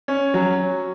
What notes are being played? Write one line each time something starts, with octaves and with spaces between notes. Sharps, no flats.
C#4
F#3